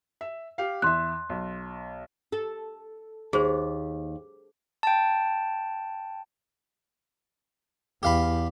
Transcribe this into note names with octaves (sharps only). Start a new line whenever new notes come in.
E5
G4 F5
E2 E5 C6 F#6
B1
A4
D#2 G#4 C5
G5 A5
E2 G4 F5 B5